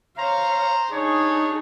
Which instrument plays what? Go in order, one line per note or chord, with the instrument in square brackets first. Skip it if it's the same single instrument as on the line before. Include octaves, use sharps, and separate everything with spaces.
[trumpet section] C5 A#5 [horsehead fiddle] C#5 F5
[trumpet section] D4 C#5 [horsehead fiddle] D#4 G#4